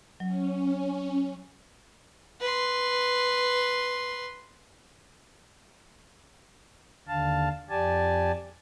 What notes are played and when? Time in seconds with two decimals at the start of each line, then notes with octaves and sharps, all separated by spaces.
0.20 F#3 C#4
2.41 B4 C6
7.08 D#2 D3 F5 A5
7.70 F2 G4 D5 G#5 A5